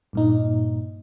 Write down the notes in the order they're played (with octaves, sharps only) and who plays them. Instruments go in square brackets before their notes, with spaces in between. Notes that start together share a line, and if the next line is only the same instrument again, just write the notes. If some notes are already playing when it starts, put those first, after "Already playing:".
[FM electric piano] G2 A#2 D#4